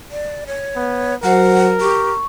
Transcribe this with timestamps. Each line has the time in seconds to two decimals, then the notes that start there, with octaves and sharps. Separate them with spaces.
0.12 D5
0.47 C#5
0.76 B3
1.23 F#3 F#4 A#4 C5 F#5
1.81 G4 C#6